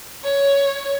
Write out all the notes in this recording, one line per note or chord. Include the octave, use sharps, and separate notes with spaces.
C#5